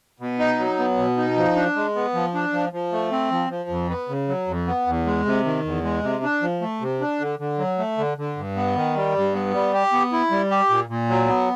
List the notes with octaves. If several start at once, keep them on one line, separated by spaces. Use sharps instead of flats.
B2
D#4
F#3
B3
B2
D#4
F3
D4
G#3
B3
F3
D4
F3
F3
A3
C4
F3
F3
F2
B3
C#3
F#3
F2
B3
E2
G#3
C3
D#3
E2
G#3
C3
D4
F3
A3
C3
D4
D3
D3
F#3
A3
D3
D3
G2
B3
D#3
G3
G2
B3
G3
G4
B3
E4
G3
G4
A#2
A#2
F#3
B3